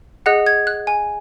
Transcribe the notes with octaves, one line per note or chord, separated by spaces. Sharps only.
G#4 D#5 F#5 F#6
G#6
F#6
G#5